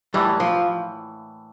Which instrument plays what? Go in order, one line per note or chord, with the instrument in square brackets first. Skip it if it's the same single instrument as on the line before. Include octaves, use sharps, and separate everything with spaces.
[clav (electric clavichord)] A2 E3 A#3 D4 [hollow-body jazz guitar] G3
[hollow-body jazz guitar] F3